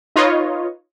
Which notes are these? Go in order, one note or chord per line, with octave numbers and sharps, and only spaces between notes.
D#4 F4 B4 C#5 D#5